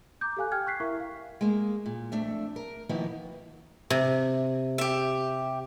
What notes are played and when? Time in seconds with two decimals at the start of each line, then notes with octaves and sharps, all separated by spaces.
0.21 A#5 D6 G6
0.37 G4 A4 F5 G#5 F#6
0.52 G5 F6 G#6
0.67 C#6 F#6 B6 C7
0.80 E4 A#4 E5 C#6
1.00 F5
1.41 G#3 A#3
1.86 A#2
2.12 F2 A3 D4 E5
2.56 A#4
2.89 D#3 F3 A#3 B3 D#4 E4
3.90 C3
4.78 G4 E5